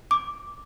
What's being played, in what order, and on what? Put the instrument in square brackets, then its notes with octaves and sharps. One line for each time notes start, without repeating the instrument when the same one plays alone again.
[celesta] D6